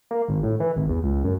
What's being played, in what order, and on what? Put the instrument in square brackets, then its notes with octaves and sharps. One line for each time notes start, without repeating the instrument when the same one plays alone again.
[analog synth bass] A#3
G#1
A2
E3
G#1
E2
C#2
F#2